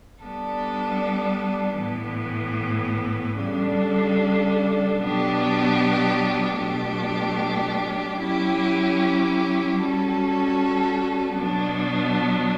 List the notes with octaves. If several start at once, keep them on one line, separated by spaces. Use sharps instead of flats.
G3 B3 D4 A4
A2 E3 B3
C#3 G3 D4 A4
B2 F#3 B3 D4 G4
B2 F#3 A3 D4 G4
F#3 C#4 E4 G4
G3 C#4 F#4 A4
B2 F#3 B3 D4